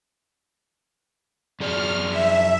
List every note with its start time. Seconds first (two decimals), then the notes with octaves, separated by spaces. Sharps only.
1.60 F#2 G#4 D5 F6
2.09 E5